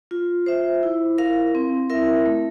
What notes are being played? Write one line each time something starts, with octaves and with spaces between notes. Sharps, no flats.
F4
C5 E5
E4
A#4 F5
C4
E4 A#4 E5
A3